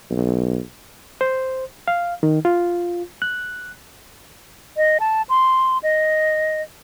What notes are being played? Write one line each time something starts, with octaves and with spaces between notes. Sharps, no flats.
B1
C5
F5
D#3
F4
F#6
D#5
A5
C6
D#5